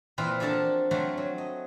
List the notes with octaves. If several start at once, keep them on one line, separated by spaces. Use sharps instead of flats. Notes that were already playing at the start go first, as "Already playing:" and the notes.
A#2 E3 C4 F4 B4 A#5
F3 D4 F#4 A4 A#4 A5
F3 F#3 A3 C4 F#4
F#3
D#5